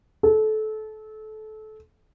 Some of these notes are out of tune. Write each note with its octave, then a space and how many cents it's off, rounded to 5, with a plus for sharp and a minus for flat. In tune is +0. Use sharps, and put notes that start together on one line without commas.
A4 -25